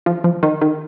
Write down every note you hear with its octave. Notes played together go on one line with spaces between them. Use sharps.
F3
F3
D#3
D#3